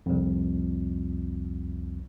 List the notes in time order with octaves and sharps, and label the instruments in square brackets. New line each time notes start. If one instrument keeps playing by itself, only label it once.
[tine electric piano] C2 F2